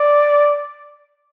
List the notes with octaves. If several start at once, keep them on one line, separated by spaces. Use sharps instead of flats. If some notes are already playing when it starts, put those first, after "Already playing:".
Already playing: D5